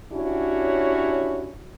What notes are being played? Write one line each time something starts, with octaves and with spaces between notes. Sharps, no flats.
C#4 D4 E4 F#4 G4 C#5